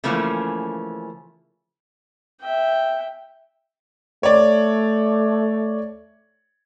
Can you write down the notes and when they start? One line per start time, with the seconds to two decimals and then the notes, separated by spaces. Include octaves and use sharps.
0.04 C#3 E3 F3 A3 A#3 C#4
2.41 E5 G5
4.23 A3 C#5 D5